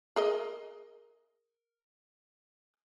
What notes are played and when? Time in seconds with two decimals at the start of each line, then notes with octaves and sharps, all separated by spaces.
0.16 G#4 A#4 D#5